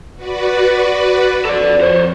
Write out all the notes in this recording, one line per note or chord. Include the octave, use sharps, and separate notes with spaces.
F#4 B4 D5
F2 A4 D5
C5 C#5